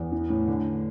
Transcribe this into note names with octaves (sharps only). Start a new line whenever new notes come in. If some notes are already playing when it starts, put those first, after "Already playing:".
Already playing: E2
E3
A2
D3